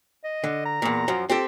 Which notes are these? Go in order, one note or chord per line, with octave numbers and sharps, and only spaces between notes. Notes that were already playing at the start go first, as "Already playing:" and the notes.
D#5
D3
A#5
E2 A#2
F#2 F3
C4 F4 G4 A4